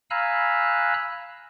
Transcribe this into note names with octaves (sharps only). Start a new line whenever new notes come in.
F5 G#5 A#5 B5 E6 F#6